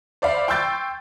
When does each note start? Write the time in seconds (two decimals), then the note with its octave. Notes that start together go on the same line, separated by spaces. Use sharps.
0.22 C5 D5 E5 F5 B5
0.48 G5 C6 C#6 E6 G6 A6